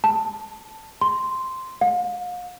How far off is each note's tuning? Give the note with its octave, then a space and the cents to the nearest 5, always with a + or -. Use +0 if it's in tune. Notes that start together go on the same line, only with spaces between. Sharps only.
A5 +5
C6 -5
F5 +40